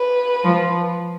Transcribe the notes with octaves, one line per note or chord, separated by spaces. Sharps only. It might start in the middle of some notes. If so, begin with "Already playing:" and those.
Already playing: B4
F3